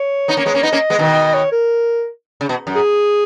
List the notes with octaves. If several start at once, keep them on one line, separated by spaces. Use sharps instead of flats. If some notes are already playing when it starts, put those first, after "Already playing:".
Already playing: C#5
B3 D#4
A#3 C#4
G#3 B3
A#3 C#4
B3 D#4 D#5
A#3 C#4
G#3 B3
B2 D#3
C#5
A#4
C#3
B2
F#2
G#4